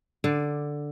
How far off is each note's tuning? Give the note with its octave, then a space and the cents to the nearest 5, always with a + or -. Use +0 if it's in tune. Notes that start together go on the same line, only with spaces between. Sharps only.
D3 +0 D5 +0